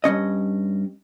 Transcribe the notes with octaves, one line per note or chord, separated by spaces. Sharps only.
G2 C#3 C#4 D#5